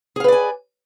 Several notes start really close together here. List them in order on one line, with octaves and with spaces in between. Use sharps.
G#4 F5 B4 D5 G#5